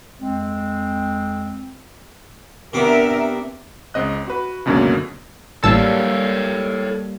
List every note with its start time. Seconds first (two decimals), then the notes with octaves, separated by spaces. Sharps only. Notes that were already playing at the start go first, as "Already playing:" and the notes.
0.21 F2 G#3 C4
2.73 C3 B3 D4 A#4 E5 D6
3.94 C#2 C4 D#5 F#6
4.28 F#4 B4
4.65 C#2 F#2 B2 D3 F#3 A#3
5.64 A1 G3 A#3 A4 C#5 F5 A5 E6